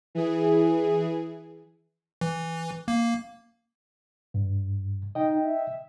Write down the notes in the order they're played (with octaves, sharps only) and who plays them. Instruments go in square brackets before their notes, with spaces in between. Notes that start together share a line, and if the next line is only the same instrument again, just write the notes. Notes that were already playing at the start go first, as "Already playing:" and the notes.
[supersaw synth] E3 G#4
[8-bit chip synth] E3
A#3
[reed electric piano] G2
[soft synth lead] D#4 [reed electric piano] D#5 G5
[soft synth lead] E5